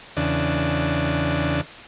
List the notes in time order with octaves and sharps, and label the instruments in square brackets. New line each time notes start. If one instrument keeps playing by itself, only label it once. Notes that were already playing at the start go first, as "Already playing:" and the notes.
[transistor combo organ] E2 C#3 D4